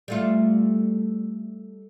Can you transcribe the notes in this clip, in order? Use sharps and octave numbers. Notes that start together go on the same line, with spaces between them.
G3 A3 F4